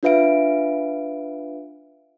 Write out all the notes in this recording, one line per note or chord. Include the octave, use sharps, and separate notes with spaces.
D4 F4 B4 E5 F5 D7